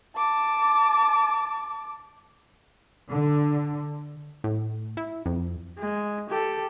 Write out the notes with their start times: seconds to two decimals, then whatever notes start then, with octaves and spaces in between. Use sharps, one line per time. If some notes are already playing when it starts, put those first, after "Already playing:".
0.16 A5 D6
3.11 D3
4.44 A2
4.97 E4
5.26 F2
5.78 G#3
6.30 G4 A4